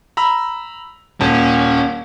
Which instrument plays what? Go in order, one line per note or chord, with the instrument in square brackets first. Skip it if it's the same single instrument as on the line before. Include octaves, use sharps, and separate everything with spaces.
[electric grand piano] A#5 B5 E6
[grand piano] D#1 [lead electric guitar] C#4 [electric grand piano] A5